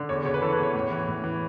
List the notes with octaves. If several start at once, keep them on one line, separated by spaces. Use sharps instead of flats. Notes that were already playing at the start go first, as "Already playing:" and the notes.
Already playing: D3
E2 C#5
C#3 C#5
B4
E3 A4
B4
E2 C#5
A2
E3
A2
E3